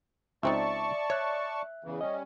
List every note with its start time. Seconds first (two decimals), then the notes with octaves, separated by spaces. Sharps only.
0.43 C#2 C4 D#4 D5 E5 A5 C#6
1.10 C#5 E5 F#6
1.84 E2 C#3 E3
2.01 G3 C#4 D#5